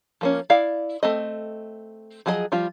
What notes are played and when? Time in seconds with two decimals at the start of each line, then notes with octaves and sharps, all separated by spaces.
0.21 F3 A#3 C#4
0.50 E4 D5 F5
1.03 A3 C4 D#5
2.26 F3 F#3 G#4 A4 D#5
2.52 F3 G3 F4